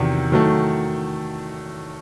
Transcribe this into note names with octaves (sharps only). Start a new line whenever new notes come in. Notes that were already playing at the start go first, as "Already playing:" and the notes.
Already playing: E2 C3 D#3 F#3
D#3 F#3 A3